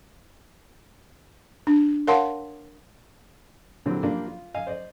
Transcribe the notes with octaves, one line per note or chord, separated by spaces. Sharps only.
D4
A#4 C#5 F5 F#5 A5 C6
A#2 D3 E3 F#3 G3 C4
F3 G3 A#3 D4 F4
F4
D#5 F5 G#5
C5 D5 D#5